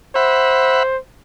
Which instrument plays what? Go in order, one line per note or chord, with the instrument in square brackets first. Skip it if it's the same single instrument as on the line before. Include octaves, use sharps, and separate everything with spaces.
[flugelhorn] C5 [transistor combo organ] E5 F#5 B5